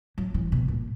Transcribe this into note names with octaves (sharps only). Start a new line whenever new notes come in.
F#3
E3
B2
A#2